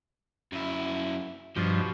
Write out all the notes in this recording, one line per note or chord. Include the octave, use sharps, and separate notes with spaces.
F#2 E4
G2 B2 F3